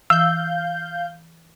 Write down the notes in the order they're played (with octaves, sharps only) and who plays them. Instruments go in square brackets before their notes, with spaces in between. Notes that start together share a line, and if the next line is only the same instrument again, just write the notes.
[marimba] E3 [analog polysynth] F5 G6 [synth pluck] E6